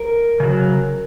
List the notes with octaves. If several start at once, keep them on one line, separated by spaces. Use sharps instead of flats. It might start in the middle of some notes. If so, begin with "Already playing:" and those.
Already playing: A#4
C#3 F#3